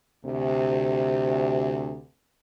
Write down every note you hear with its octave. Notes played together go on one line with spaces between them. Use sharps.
D2 C3